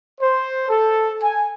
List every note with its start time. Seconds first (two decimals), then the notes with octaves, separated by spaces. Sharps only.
0.21 C5
0.69 A4
1.21 G#5